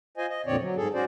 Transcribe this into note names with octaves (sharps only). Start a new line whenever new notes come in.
F4 C5 D#5 G#5
D#5
F2 A#2 D3 C4 C#5 D5
F#3
G#2 G#4 A4
C#4 F#4 C5 D5